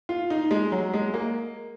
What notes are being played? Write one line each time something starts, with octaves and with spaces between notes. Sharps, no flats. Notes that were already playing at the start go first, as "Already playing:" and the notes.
F4
D#4
G#3
F#3
G#3
A#3